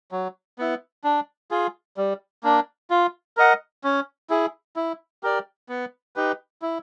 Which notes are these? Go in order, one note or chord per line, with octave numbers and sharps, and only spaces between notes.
F#3
B3 E4
D4
F4 G#4
G3
A#3 D4
F4
A#4 D#5 F#5
C#4
E4 G#4
E4
G4 A#4 D5
B3
D#4 G4 B4
E4